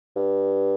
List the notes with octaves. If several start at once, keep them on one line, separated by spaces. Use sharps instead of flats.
G2